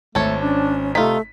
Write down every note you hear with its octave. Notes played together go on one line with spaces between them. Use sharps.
G#1 A3 A4 C#5
C#4 D4
C3 A3 D#4 F4 B6